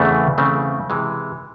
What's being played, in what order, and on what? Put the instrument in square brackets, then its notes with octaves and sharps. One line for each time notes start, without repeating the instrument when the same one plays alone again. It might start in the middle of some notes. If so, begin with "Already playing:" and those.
Already playing: [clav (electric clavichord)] E2 C#3 E3 A3 C4
E2 C#3 E3 A3 C4
C3 E3 G#3